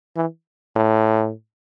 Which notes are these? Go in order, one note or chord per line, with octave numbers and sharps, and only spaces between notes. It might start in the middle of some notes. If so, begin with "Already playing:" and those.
E3
A2